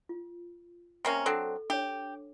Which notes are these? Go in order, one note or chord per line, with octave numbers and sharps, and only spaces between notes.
F4
C3 A#3 C#4
F#3 C4 D4 A4
D4 G4 C#5